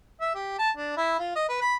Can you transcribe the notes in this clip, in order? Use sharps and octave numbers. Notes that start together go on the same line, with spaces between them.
E5
G4
A5
D4
E4
F4
D#5
B4
B5